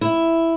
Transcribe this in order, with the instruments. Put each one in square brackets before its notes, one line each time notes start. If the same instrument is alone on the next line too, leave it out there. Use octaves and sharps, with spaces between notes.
[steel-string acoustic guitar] E4